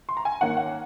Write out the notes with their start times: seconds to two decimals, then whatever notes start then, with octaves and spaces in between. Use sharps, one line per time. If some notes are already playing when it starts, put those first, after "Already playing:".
0.09 C6
0.17 A#5
0.25 G#5
0.41 D#3 A#3 C#4 F#5
0.57 F#5